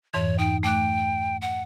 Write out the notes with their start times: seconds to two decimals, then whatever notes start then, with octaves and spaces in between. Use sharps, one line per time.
0.14 F2 G#2 E3 C#5
0.39 D#4 G5
0.63 A3 G5 D6 F#6
1.41 F#5